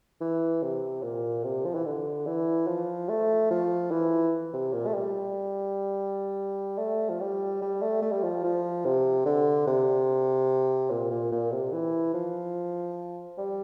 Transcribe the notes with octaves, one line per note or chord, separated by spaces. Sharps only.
E3
C3
A#2
C3
F3
E3
D3
E3
F3
A3
F3
E3
C3
A#2
A3
G3
A3
F3
G3
G3
A3
A3
G3
F3
F3
C3
D3
C3
A#2
A#2
A#2
C3
E3
F3
G3